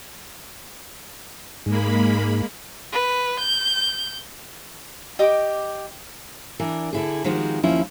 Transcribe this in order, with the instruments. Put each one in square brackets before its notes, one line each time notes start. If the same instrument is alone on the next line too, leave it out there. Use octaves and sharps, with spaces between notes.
[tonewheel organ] G#2 [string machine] G#3 A#3 B5
[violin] B4
G6
[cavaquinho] G4 D#5 D6
[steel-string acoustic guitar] E3 D4 A#4
D3 E4 G#4
D#3 F3 G#3 C4 F#4 G4
D#2 F3 C#4 E4